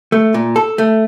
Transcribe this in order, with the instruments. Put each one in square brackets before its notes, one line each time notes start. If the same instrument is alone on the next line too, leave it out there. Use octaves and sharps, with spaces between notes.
[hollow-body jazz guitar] A3
A#2
A4
A3